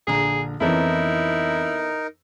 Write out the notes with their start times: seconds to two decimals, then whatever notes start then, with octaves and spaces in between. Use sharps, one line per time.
0.07 A#1 D3 G#4 A#5
0.61 F2 E3 B3 C#4 D#4 E4 A4 A#4